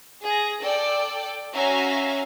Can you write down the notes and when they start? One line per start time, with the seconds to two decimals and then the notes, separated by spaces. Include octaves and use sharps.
0.23 G#4 A#6
0.63 A4 D5 G5
1.55 C#4 F#4 E5 F5 G#5 A#5